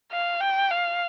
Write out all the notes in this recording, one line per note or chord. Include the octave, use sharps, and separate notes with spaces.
F5
G5
F5